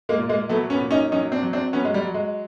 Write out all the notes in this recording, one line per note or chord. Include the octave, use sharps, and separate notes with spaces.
G#3 A#3
A#2
G#3 A#3
F#3 A3 B3
B3 C#4
A#2
C#4 D#4
F#3 C#4 D#4
C4 D4
F#3
C4 D4
F#3 B3 C#4
G#3
G3
F#3
G#3